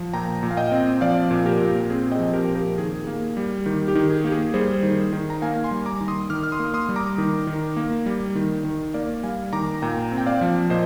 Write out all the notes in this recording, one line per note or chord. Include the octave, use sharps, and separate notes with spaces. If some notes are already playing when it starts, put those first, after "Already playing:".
Already playing: F3
A#2 G5 A#5
A#2
F5
D#5 G5
C4
F3 D5 F5
A#2
G4 A#4
A#2
C4 G#4
D#5 G5
F3
G4 A#4
A#2
G4 A#4
D#3 G#4
A#3
G3
D#3 G4
G4
D#3
G#4
A#3 G4
G#4
G3 G#4 C5
D#3
D#3
A#5
A#3 F5 G#5
G#5 C6
G3
A#5 D6
D#3
C6 D#6
D#3 D6 F6
F6
C6 D#6
A#3
C6 D#6
G3
A#5 D6
D#3
D#3
A#3
G3
D#3
D#3
A#3 D5 F5
G3 F5 G#5
D#3 A#5 D6
A#2 G5 A#5
C4
G5
D5 F5
F3
A#2 C5 D#5